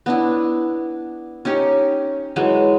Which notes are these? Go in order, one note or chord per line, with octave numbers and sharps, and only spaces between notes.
B3 D4 E4
C#4 D#4 G4 C#5
E3 F#3 G#3